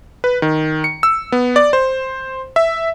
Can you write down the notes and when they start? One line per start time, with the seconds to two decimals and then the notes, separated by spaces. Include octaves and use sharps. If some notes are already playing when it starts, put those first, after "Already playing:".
0.24 B4
0.42 D#3
0.84 C#7
1.03 E6
1.32 B3
1.56 D5
1.73 C5
2.56 E5